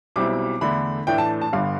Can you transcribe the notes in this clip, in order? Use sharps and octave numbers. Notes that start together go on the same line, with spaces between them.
B1 B2 G3 C4 E4 D6
E2 D3 A3 D4 B5
A2 E3 A3 D4 G5
A5
A5
G1 G2 D3 G3 F5